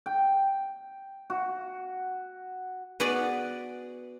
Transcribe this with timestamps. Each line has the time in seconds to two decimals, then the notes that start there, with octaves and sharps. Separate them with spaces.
0.06 G5
1.30 F#4
3.00 B3 F#4 G#4 B4 D5